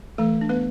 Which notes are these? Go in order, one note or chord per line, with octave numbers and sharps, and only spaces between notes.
E3 A3 A4
D4
B3 B4